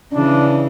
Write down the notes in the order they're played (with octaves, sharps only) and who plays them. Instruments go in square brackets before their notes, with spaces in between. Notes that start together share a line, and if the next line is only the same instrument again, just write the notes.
[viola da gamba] C#3 E3 [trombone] D4